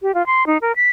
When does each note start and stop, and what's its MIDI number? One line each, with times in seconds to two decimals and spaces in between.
0.02 0.14 67
0.15 0.25 65
0.26 0.46 84
0.47 0.58 63
0.62 0.72 70
0.76 0.90 95